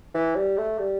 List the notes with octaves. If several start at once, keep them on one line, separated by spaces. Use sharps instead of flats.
E3
G3
A3
G3